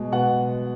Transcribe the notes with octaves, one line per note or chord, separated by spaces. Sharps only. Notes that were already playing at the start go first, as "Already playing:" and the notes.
Already playing: B2 G#3
B2 F#5